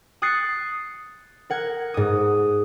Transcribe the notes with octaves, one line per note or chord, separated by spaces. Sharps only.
D#6 F#6 G#6 A6 C7 C#7
A#4 F#5 G#6
G#2 D#6